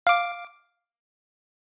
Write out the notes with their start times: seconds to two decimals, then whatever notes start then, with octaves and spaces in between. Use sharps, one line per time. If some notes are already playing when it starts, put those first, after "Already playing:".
0.07 F5 D6